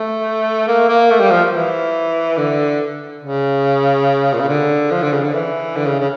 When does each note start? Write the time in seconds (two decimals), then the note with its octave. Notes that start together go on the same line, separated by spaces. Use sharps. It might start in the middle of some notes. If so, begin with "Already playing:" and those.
Already playing: A3
0.68 A#3
0.89 A#3
1.11 A3
1.20 G3
1.31 F3
1.52 E3
2.37 D3
3.22 C#3
4.34 A#2
4.41 C#3
4.49 D3
4.91 F3
5.02 D3
5.13 C#3
5.24 D3
5.34 E3
5.76 D3
5.86 C#3
6.00 C#3